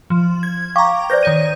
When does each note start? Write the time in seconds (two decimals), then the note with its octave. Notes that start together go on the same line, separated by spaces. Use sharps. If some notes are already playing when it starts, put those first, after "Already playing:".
0.10 F3
0.43 G#6
0.76 F5 G5 A#5 C#6 D6
1.10 B4 C5 D5 G6 A#6
1.23 D#3 C#5 D#7